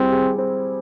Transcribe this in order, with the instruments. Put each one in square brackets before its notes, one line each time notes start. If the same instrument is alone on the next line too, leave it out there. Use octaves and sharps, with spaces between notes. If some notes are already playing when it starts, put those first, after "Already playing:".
Already playing: [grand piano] G3 E4 G#4 [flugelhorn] C4
[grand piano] G#4
C4